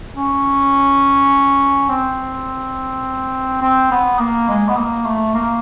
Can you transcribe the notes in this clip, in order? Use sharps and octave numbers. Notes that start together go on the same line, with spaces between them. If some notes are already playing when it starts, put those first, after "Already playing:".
C#4
C4
C4
B3
A#3
G#3
B3
A#3
A3
A#3